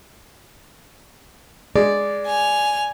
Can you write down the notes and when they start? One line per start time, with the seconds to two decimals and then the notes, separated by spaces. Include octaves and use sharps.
1.76 G#3 D5
2.26 G#5 F7